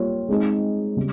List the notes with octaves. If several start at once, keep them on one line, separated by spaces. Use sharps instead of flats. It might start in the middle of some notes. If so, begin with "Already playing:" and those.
Already playing: G3 A#3 F4 C#5
G#3 C4 D#4 G#4
C#3 G3